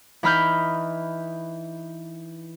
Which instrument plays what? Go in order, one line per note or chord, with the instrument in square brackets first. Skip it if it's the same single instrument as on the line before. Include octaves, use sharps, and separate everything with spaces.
[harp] E3 D#4 B5 F6 G6